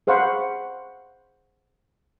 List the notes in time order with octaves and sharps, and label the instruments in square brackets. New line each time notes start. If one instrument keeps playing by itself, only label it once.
[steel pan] G#4 C5 F5 F#5 B5 C#6